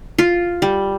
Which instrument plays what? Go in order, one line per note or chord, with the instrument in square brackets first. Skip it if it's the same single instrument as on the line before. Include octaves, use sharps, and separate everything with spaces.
[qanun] F4
G3